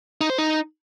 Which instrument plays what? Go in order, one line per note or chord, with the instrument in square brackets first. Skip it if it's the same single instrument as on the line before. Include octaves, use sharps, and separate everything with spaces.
[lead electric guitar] D#4
C5
D#4